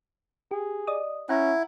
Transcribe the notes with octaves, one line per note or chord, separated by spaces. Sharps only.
G4 G#4
D5 D#5 D#6
C#4 E4 F#5 A#5